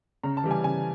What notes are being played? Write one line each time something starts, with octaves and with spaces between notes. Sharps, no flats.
C#3 A#5
A5
E3 G3
G#5
C#3 G#5